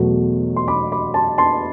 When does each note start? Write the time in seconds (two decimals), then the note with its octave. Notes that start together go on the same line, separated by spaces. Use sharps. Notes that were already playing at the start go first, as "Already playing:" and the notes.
Already playing: E2 B2 F#3 A3
0.56 C6
0.68 B5 D6
0.92 B5 D6
1.14 A5 C6
1.38 A5 C6